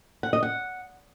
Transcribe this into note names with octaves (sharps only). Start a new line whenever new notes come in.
F#5
D#5
F#5